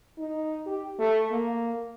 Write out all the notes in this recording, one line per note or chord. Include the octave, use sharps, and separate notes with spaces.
D#4
G4
A3
A#3